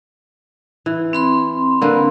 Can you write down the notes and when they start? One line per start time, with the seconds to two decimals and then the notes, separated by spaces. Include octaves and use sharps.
0.86 E3
1.13 C4 B5 C6
1.82 D3 A#3 B4